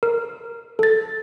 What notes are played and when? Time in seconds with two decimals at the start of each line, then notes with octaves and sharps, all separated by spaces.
0.03 A#4
0.79 A4 A6